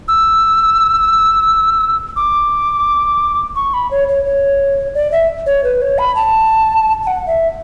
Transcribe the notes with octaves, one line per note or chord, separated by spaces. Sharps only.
E6
D6
C#6
B5
C#5
C#5
C#5
D5
E5
C#5
B4
C#5
B5
A5
A5
F#5
E5